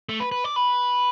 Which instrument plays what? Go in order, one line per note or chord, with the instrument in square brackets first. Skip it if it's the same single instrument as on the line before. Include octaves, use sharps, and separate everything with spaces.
[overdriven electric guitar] A3
B4
B4
D5
B4